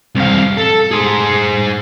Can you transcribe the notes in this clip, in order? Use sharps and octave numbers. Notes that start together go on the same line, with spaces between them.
C2 F5
A4
G#4 C5